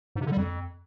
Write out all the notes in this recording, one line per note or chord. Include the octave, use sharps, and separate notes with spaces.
G#2
C3
D3
G3
F2